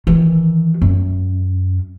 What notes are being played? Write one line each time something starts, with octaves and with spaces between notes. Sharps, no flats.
D#3 E3
F#2